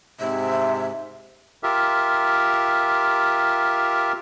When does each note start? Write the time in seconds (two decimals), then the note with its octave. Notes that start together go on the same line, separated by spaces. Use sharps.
0.20 G#2 C3 E5
1.63 F4 G4 A#4 E5